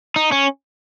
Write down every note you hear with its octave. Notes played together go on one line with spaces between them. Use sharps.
D#4
C#4